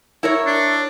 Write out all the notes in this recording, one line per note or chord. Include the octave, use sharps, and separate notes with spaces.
E4 A#4 C#5
D4